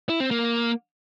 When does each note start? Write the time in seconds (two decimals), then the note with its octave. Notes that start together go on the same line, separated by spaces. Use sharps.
0.09 E4
0.20 C4
0.31 A#3